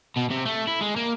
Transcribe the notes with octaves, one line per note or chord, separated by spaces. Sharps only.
B2
C3
A3
E4
G#3
A#3